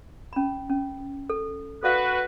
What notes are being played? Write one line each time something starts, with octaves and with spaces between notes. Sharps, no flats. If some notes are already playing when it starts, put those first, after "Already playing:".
C#4 B5
C#4
A4
F#4 A4 B4 D5 F5